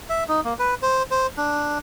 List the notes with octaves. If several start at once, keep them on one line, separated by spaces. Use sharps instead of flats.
E5
D#4
A#3
B4
C5
C5
D4